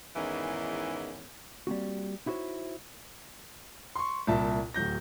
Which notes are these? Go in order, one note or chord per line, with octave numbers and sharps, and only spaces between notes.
E2 G#2 D#3 E3 C#4
G3 A#3 C4 F#4
D#4 E4 F#4 G#4 C5 C#5
C6 C#6
C2 A#2 E5 A5
D1 F#3 G6 A#6